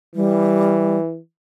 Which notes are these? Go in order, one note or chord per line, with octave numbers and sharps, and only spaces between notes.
E3 G3